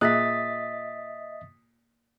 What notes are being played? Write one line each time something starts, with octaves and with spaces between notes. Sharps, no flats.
A#2 G#4 D#5 E5 D#6 F#6 A6 B6